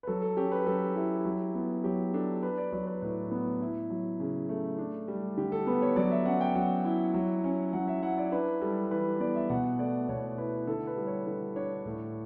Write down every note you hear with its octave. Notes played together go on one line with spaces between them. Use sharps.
B4
F#3 A4
A4
C#4 G4
B4
F#3 A4
E4 G4
F#3
B3
F#3 G4
D4 A4
D4 B4
D5
F#3 D5
B4
A2 B4
B3
E4
F#3
C#3
A3
D4
G3
D3 G4
A4
B3 B4
C#5
F#3 D5
E5
C#4 F#5
G5
F#3 F#5
E4
F#3
C#4
F#3 F#5
E5
E4 F#5
D5
D4 B4
G3 A4
E3 B4
B3 D5
E5
B2 F#5
A3 D5
B2 C#5
C#5
E4 B4
D3 A4
B4
G3
C#5
D3 B4
D4 C#5
A2